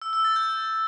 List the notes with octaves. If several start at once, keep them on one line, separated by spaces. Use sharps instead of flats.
E6
E6
A6
G6